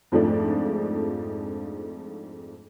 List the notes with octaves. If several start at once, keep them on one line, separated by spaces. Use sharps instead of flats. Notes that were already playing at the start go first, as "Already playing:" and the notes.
F2 G#2 F3 G#3 A3 D4